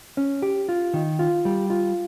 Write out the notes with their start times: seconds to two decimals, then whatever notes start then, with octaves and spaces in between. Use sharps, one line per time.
0.17 C#4
0.42 G4
0.69 F4
0.94 D#3
1.19 F4
1.45 G3
1.70 F4